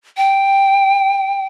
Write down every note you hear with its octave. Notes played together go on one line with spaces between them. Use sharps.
G5